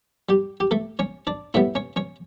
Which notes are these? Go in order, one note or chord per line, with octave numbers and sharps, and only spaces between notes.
G3 G4
G4
A3 A4
C#4 C#5
D4 D5
A2 G3 B3 E4 E5
C#4 C#5
C#4 C#5